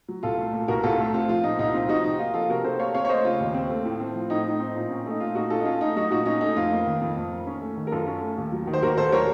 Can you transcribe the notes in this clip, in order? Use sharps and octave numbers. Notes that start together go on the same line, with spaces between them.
F#3
C2 F4 A4
A3
A#2
C2 F#4 A#4
C2 F4 A4
A3
C4 F4
F3 F4
A#2 D#4
C2 D#4
C4 F4
F3 D#4 F#4
C3 D#4
A#3 F4
F3 F4 A4
C3 F#4 A#4
C3 A4 C5
A#3 C#5 F5
C4 C#5 F5
C#5
A3 C5 D#5
C#3 F4
D#2
C4
A3
A2
C4
F3
A2 D#4
A2 D#4
C4
A#2
C#4
A3 D#4
A#2 F4
A#2 D#4 F#4
C#4 F4 A4
D#4
C#4 F4
A3 D#4
F#3 D#4 F#4
A#2 D#4 F#4
C#4 D#4
A3 D#4
F2 F4
A#3
D#3
F2
F2
A#3
C#4
A3
D#3
A#4
F#2 F4 A4
C#4
A3
D#2
F#3
D#3
C5
D#2 F#4 A#4
D#2 A4 C5
F#3 A#4 C#5